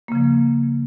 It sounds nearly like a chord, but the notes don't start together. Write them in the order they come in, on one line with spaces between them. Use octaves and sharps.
A#3 C#3 F3